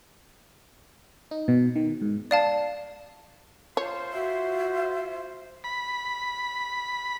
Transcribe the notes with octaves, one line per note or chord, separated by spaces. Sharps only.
D#4
B2
D#3
G#2
D5 F5 A5
F4 C5 C#5
F#4 E5
B5